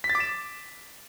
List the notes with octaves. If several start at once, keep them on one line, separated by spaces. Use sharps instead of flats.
B6
A6
D6
E7